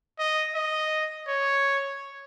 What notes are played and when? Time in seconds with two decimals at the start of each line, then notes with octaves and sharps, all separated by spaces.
0.19 D#5
0.55 D#5
1.28 C#5